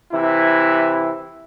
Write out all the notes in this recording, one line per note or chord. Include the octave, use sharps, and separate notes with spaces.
C3 E3 E4